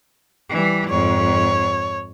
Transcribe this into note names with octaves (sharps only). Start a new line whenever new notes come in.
E3 G3
F2 G#2 C#5